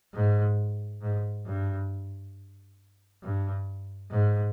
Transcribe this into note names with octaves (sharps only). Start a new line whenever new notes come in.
G#2
G#2
G2
G2
G#2